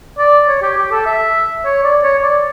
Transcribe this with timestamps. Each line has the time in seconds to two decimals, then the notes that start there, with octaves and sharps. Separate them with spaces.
0.18 D5
0.48 C#5
0.62 G4
0.77 G4
0.91 A4
1.06 E5
1.65 C#5
1.84 D5
2.03 C#5
2.22 D5